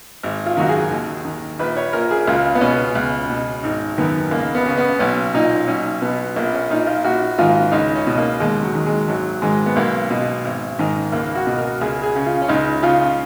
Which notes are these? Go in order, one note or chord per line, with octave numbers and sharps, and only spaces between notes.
G#1
F4
F#2 D#3 F#4
G#4
D#2
D#3
A#1 B4
C#5
A#2 A#4
G#4
C#2 F4
B3
B2 C#4
C#2
B2
G#1 D#4
F#2 D#3 B3
C#2 A#3
B3
C#3
B3
B1 C#4
A#2 D#4
B1 C#4
B2 B3
A#1 A#3
C#4
A#2 D#4
F4
A#1 F#4
G#2 D#3 F4
C#2 D#4
C#4
B2
A#3
D#2 G#3
F#3
D#3
G#3
G#1 F#3
G#2 D#3 G#3
B3
B1 A#3
B2
G#1
G#2 D#3
C#2 A#3
F#4
B2
A#4
C#2 G#4
G#4
C#3
F4
C#4
C#2 D#4
C#3 F4